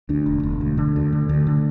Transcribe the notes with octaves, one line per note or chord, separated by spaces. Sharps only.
D2 D4
E1
E1
D2
D3
D2
D3
D2
D3